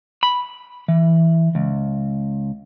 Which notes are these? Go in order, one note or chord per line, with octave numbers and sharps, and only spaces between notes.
B5
E3
C#2